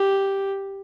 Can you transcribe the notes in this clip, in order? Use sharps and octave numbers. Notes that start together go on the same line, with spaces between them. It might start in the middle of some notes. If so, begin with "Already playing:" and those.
Already playing: G4